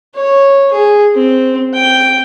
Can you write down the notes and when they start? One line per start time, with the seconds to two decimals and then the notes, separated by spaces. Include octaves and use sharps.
0.14 C#5
0.72 G#4
1.14 C4
1.73 G5